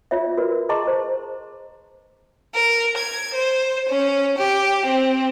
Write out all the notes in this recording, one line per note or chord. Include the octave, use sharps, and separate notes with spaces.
F4 C#5 D5 E5
F#4 A#4 B4 D5
G#4 D#5 A5 A#5 C6 C#6
C5
A#4
G#6
C5
C#4
G4
C4